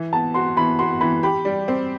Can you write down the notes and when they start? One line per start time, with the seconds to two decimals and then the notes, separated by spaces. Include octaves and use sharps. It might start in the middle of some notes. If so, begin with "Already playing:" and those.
Already playing: E3
0.12 B3 A5
0.34 F#4 C6
0.57 E3 B5
0.79 F#4 C6
1.01 E3 B5
1.23 G4 B5
1.45 G3
1.68 C4